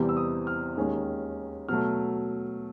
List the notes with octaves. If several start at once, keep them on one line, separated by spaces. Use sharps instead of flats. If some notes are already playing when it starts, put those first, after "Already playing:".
Already playing: E2 C3 E3 G3 C4
E6
D#6
F6
D#2 D#3 G#3 C#4
B2 F#3 A3 F6